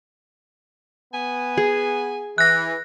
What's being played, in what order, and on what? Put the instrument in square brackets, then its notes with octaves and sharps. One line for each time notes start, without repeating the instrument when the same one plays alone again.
[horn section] B3 G#5
[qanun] G#4
[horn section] E3 [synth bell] F#6 A#6